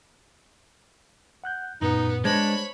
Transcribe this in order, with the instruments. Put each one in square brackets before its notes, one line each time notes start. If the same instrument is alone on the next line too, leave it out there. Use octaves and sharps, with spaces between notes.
[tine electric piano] F#5 F#6 G6
[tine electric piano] F#2 A#2 [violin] B3 [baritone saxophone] D#4
[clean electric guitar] G#3 [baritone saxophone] D4 [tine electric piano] C5 [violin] C#5 B5